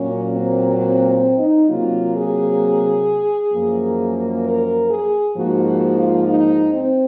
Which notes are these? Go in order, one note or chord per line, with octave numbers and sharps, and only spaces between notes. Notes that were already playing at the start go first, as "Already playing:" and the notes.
Already playing: A#2 F#3 A#3 C#4
C4
C4
C4
D#4
C3 F#3 A#3 F4
G#4
F#2 F3 A#3
A#4
G#4
G#2 F3 A#3 F#4
F#4
F4
D#4
C4